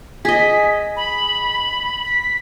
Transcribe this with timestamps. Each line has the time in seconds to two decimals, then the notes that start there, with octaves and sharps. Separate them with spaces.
0.25 G#4 D#5 B6
0.96 B5
2.05 B6